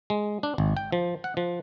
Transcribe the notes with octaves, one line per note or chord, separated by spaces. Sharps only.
G#3
D4
G#1
G5
F3
F#5
F3